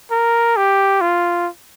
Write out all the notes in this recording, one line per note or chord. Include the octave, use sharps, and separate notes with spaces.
A#4
G4
F4